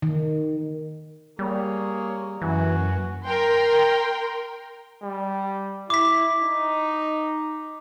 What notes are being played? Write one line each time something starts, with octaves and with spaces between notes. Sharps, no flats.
D#3
G3 A#3 G#4 C#5
F#2 E3 F#4 G#5
A#4 G5 C6
G3
E4 D6 B6
D#4